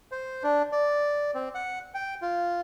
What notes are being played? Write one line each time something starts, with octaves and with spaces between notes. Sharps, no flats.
C5
D4
D5
C4
F#5
G5
F4